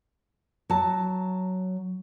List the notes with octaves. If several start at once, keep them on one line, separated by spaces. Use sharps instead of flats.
F#3 A5